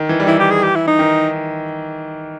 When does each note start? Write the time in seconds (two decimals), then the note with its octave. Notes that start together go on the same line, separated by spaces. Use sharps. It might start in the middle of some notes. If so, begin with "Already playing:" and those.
Already playing: D#3
0.09 E3
0.20 G3
0.27 E3 E4
0.39 G4
0.51 G#4
0.63 G4
0.75 E4
0.87 D#4
0.99 D#3